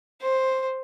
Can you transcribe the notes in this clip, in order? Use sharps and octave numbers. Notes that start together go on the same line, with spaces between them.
C5